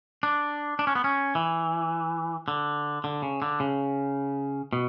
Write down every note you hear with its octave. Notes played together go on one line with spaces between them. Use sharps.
D4
D4
C#4
B3
C#4
E3
D3
D3
C#3
D3
C#3
B2